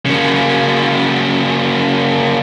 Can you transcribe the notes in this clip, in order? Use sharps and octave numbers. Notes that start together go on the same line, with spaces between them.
C#3 A#3